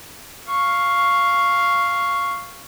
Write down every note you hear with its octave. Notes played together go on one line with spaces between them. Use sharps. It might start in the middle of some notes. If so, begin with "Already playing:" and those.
F5 C#6